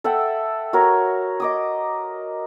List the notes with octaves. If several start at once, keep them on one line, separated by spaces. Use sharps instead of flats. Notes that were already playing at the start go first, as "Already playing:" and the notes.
A4 E5 F#5 G5
F#4 A#4 C#5
D#5 D6 D#6